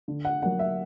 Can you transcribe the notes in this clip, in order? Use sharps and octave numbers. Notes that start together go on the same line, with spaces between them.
D3
F#5
F#3 A#3 F#5
E5